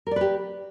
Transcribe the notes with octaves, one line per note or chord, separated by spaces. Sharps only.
G4 A#4 B4 D5